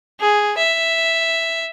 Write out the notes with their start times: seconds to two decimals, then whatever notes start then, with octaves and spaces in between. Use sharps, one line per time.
0.20 G#4
0.58 E5